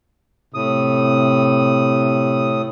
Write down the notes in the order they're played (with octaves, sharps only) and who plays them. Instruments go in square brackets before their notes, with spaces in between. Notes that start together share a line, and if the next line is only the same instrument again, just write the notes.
[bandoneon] A2 D#6 [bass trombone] C3